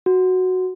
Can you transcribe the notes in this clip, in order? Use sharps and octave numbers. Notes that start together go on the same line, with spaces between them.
F#4